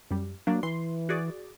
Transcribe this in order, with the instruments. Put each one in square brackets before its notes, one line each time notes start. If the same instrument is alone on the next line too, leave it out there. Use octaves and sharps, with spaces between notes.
[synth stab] F#2 G3
[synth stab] F#3 D4 [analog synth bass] A#3
[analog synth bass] E3 [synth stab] C6
[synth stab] F#4 G#4 D5